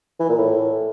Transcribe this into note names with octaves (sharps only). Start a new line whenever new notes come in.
E3
A#2
A2